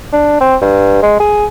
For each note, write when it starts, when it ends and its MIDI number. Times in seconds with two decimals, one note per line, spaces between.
0.13 0.38 62
0.41 0.56 60
0.62 1.02 43
1.03 1.17 56
1.20 1.46 68